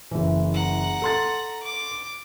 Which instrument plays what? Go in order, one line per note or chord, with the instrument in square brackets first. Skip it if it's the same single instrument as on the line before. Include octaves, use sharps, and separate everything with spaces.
[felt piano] F#1 E3
[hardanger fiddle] F#5 A#5
[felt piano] A4 C6 A6
[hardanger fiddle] D6